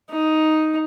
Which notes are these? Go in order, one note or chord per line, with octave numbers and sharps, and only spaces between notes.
D#4